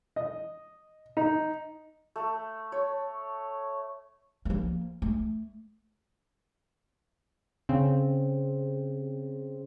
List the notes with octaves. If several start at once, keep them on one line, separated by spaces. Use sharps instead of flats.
D#5
D#4
A3
C#5
F3 A#3
A3
C#3 C4